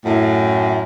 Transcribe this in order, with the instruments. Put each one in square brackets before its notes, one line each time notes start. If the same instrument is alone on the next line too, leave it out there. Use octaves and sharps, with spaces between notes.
[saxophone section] F#2 A2